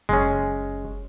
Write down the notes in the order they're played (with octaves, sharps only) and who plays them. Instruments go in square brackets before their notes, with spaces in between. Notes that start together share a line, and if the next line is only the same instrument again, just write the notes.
[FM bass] F#1 [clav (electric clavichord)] G#3 C#4